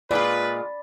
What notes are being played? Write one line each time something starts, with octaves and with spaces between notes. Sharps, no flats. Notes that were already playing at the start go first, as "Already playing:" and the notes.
A#2 G#3 F4 B4 D5 A5 B5